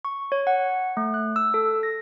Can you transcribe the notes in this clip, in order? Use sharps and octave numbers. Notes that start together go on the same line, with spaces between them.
C#6
C#5
F#5
A3
F#6
E6
A4
A#6